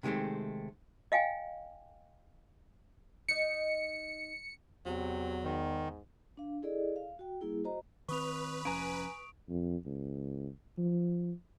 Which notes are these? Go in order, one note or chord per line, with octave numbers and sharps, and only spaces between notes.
C3 D#3 G#3 A3 C4
D#5 F5 G5 G#5
D#4 D#5 C#7
E2 C3 F#3
G#2 D#3
D4 F5
E4 G#4 A4 D5 D#5
F5
F#4 G5
G3 A#3 E4 G#4
F#4 C5 D#5 A#5
D#3 C4 B4 C#6 D#6 F7
F1 F3 C#4 G#5 A#5 D7
F2
C#2
F3